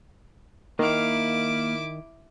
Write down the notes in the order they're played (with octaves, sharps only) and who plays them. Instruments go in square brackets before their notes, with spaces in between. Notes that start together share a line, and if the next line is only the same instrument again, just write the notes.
[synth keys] D#3 [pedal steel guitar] A#3 F5 [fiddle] E4 D6